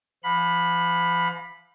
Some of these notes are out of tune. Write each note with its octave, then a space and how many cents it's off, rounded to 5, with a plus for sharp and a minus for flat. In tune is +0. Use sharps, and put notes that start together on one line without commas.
F3 -40 F5 +40 B5 +0